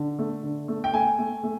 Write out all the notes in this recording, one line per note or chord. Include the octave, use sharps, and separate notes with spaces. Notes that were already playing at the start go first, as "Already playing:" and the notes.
Already playing: D3
A3
D3
A3
G5
A3 G#5
A3
A3